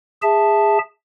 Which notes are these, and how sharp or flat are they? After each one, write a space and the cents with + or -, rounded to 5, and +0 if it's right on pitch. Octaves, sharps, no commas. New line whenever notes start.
G#4 -20 E5 +0 A5 -5